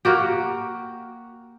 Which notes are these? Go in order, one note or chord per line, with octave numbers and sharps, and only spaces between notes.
A#3 F#4 G4